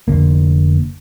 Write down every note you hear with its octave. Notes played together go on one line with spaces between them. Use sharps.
F1 D3 A#3